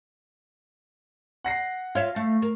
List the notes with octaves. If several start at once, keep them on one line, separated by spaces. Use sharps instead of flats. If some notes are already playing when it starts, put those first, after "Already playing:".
F#5 A#6 C7
F4 C#5 E5 F5
A3
A#4